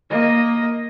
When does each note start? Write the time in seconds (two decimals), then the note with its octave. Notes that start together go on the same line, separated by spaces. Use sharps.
0.10 A#3 D#5